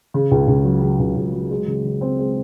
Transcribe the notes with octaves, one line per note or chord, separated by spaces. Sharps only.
C#3
C#2
C#2
F#3
C#3
C#2
C#2
F#3
G#3
C#3
C#3
C4
G#3